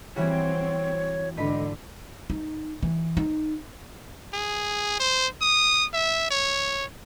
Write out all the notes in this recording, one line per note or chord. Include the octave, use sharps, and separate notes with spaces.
E3 G3 C4 F#4 C#5
G#2 D3 B4 D#5 B5
D#4
E3
D#4
G#4
C5
D#6
E5
C#5